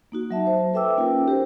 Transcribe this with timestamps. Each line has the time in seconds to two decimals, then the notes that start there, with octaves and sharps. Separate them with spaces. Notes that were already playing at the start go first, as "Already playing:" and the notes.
0.12 A#3 D#4 F#4
0.31 F#3 E5 A5
0.47 C5
0.74 A4 B4 E5 G5 D6 E6
0.97 A#3 C#4 D#4 F4 A#4 G5
1.26 F#4 G4 A#4 C5